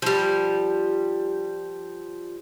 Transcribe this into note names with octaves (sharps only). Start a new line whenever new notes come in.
F3 G3